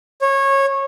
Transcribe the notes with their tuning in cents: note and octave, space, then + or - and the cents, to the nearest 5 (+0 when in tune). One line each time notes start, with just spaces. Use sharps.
C#5 -20